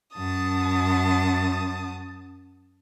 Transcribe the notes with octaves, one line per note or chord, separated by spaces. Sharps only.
F#2 A5 D#6